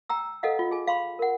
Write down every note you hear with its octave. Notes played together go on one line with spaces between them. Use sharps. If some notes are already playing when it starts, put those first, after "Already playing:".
G5 A#5 E6
A4 B4 D#5 F5 F#5
F4
G#4 G#5
F5 B5 C6
A#4 F#5